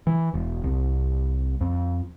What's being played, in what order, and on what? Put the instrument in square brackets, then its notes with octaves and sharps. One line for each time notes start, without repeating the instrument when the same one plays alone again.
[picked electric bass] E3
E1
C2
F2